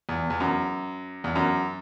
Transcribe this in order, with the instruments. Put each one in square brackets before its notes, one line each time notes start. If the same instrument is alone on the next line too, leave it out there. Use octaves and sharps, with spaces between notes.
[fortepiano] E2
E2
F#2
E2
F#2